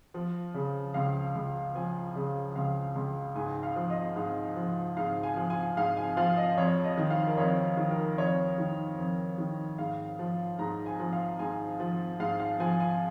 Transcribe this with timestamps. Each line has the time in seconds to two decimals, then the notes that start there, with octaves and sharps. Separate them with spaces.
0.14 F3
0.54 C#3
0.94 C#2 F5
1.35 C#2
1.75 F3 G#5
2.15 C#3
2.55 C#2 F5
2.96 C#2
3.35 G#2 G#5
3.63 F5
3.76 F3
3.90 D#5
4.16 G#2 F5
4.56 F3
4.97 G#2 F5
5.23 G#5
5.37 F3
5.50 G#5
5.77 G#2 F5
5.97 G#5
6.17 F3 F5
6.37 D#5
6.57 F2 C#5
6.84 D#5
6.98 D#3
7.10 F5
7.27 A#4
7.37 F2 C#5
7.77 D#3
7.91 A#4
8.18 F2 C#5
8.58 D#3
8.98 F2
9.38 D#3
9.78 G#2 F5
10.19 F3
10.59 G#2 A#5
10.86 G#5
10.99 F3
11.13 F5
11.39 G#2 G#5
11.80 F3
12.20 G#2 F5
12.40 F5
12.60 F3 G#5
12.80 G#5